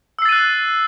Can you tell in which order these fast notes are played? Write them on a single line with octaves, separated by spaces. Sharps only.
E6 C7 A6 D#7 F#6